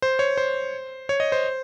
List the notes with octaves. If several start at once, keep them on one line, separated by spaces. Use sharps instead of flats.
C5
C#5
C5
C#5
D#5
C5